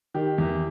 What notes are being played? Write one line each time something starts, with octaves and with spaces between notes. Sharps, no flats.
D#3 G4
E2